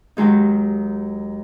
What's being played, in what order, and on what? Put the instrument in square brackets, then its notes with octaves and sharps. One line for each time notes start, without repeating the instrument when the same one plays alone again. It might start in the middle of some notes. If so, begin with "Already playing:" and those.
[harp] D#2 D#3 F#3 G#3 D#4